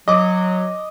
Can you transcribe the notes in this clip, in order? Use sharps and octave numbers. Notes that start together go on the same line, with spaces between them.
F#3 D#5 D6